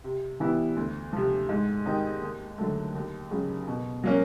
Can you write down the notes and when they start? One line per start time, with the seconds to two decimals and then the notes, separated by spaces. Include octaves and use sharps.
0.04 C3
0.40 E3 G3 B3 E4
0.76 D2
1.13 C3 F3
1.49 G#2
1.86 D#3 G3 C4 D#4
2.22 D#2
2.58 D3 F#3 A3
2.95 D#2
3.31 C#3 F#3
3.67 B2
4.04 F#3 A#3 C#4